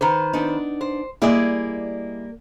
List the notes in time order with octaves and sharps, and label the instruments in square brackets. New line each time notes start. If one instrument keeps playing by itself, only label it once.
[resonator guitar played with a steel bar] D#3 B4 C5
[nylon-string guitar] B3 D4 D#4
[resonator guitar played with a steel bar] C5
[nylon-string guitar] G3 A#3 D5 [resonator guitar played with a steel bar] E4 G#4 D#5